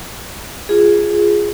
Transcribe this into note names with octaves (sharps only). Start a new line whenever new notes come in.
F4 G#4